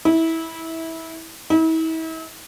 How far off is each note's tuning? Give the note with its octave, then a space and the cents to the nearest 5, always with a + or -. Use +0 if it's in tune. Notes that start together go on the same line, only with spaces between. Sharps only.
E4 -20
E4 -40